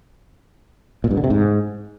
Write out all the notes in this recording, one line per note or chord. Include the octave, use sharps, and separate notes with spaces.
A#2
G2
D3
C3
G#2